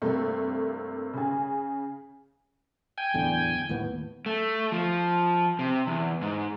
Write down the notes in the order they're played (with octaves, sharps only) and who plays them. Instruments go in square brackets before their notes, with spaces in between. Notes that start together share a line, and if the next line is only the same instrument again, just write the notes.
[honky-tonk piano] G2 C3 A3 A#3
C#3 G#4
[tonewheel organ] G5 G#5
[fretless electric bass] D1 E2 D3
D#2 A2 B3
[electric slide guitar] A3
F3
C3
E2
G#2